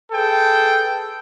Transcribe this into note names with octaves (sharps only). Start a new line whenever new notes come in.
G#4 A4 B4 G5